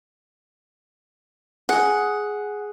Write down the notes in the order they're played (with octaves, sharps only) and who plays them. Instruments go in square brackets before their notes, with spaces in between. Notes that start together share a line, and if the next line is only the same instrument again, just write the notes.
[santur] G#4 [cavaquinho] F#5